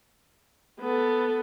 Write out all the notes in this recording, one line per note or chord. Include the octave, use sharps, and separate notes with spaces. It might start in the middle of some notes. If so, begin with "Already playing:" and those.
B3 A4